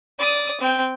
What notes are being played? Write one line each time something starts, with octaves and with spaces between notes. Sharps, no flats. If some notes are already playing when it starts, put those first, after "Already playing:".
D5 D#6
C4 G5